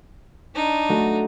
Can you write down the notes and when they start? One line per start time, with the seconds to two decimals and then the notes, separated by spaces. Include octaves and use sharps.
0.55 D4 D#4
0.89 A3 F#4